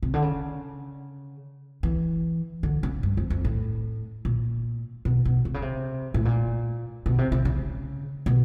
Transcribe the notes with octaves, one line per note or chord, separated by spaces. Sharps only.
C3
D3
C#3
E3
D3
C#3
G2
F2
F2
A2
A#2
B2
B2
C3
C#3
C3
A2
A#2
B2
C3
C3
C#3
B2